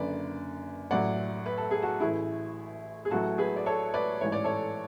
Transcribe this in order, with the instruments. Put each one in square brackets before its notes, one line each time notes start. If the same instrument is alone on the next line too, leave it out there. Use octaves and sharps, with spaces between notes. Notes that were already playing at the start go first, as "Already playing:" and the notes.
Already playing: [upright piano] F#1 F#2 D3 B4 D5
A1 A2 F#3 D5 F#5
B4
A4
G#4
F#4 A4
A1 A2 E3 E4 G#4
G#4
A1 A2 F#3 F#4 A4
G#4 B4
D5
A4 C#5
B4 D5
A1 G#2 E3 C#5
D5
A4 C#5